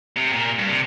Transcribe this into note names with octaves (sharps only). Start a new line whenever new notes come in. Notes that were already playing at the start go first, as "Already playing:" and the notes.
C3
A#2
G2
C3